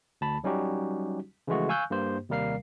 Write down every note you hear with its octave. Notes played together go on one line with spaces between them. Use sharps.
D2 A5 B5
F#3 G3 C#4 D#4 F#4 G4
C#3 E3 F3 G#3 A3 F#4
F5 G#5 C#6 E6 F#6 G6
G2 A#3 G4 C5
D#2 C3 G3 A#4 F5 C7